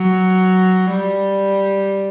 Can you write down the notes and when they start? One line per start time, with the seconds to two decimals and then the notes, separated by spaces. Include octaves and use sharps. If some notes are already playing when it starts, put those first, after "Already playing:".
Already playing: F#3
0.92 G3